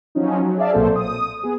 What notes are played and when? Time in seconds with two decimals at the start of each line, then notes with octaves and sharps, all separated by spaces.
0.15 F3 F#3 C#4 D#4
0.39 F#3
0.57 G#4 D5 E5 F5 A5
0.73 B1 A#2 F#3 C4 A4 C5
0.96 D#6
1.43 B3 G#4